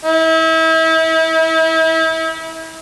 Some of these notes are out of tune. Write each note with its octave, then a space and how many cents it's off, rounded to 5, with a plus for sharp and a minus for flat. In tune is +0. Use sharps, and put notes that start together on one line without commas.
E4 -35